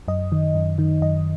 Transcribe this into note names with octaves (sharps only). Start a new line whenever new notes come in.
F#2 D#5
D#3
F#2
D#3
F#2 D#5